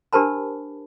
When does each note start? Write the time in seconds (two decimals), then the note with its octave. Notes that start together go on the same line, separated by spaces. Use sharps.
0.13 D4 G4 A#4 C5 A5 B5